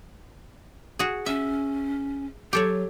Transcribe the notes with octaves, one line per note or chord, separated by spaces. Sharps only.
F#4 G#4
C#4 E5
F#3 G4 A4 C#5